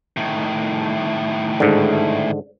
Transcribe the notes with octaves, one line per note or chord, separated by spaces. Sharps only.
A2 D#3
G#2 D3